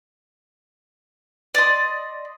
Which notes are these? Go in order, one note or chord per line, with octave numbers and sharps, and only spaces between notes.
D5 D#5 C6